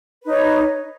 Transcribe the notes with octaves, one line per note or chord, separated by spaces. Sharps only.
D#4 B4 C#5